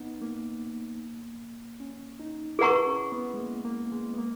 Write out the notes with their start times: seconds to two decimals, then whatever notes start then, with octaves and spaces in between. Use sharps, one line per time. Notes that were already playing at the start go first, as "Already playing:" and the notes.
Already playing: B3 D#4
0.22 A#3
1.80 C#4
2.19 D#4
2.59 E4 G#4 B4 F#5 A#5 C#6
2.86 C#4
3.12 B3
3.34 G#3
3.39 A#3
3.65 A#3
3.92 G#3
4.14 B3
4.18 A#3